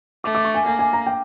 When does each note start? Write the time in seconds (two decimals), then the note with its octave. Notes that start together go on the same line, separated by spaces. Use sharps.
0.24 A3 D6
0.35 D6
0.45 C#6
0.54 G#5
0.66 A#3 G#5
0.79 G#5
0.93 A#5
1.06 G5